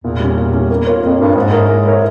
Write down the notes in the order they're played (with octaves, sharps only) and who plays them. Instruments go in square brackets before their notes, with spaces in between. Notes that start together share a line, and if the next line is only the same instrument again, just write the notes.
[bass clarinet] E2 [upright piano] A#2
[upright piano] G3 C#4
A#2
G3 C#4
A#3
F4 A#4 C#5
[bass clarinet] F2 [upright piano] A#3
[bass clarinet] G2 [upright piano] F4 A#4 C#5
[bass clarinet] G#2 [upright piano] G#3
[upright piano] E4 A#4 C#5
G#3
E4 A#4 C#5